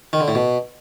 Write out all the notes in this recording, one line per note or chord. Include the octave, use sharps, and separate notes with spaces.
D#3
D3
A2
B2